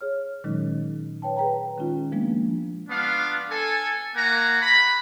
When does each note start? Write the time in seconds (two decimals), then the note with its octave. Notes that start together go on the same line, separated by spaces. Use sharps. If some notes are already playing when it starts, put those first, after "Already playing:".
0.01 G#4 C#5 F6
0.44 A#2 D#3 F#3 G#3 C#4 D#4
1.22 B4 C#5 G5 A5
1.37 G#4 B4 G5 A#5
1.78 D#3 G#3 C#4 D#4 F4
2.12 F3 G#3 A#3 B3 D4
2.90 B3 D4 F4 F5
3.49 A4 G#5
4.16 A#3 F#5 G#5 A#5
4.62 B5